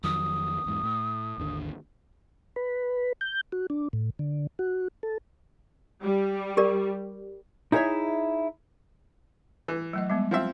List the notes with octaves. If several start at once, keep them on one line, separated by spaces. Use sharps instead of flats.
F2 D#3 F#3 D#6
E2 G#2
A2
G#1 D#2 D3
B4
G6
F#4
D4
A2
D3
F#4
A4
G3
G4 A#4 D5
D#4 E4 G#4 A#4 C#5 E5
E3
F#3 A3 D#5
G3 G#3 B3
F3 C4 E5